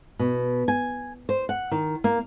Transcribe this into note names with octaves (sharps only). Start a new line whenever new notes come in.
B2
G#5
C5
F#5
D#3
A#3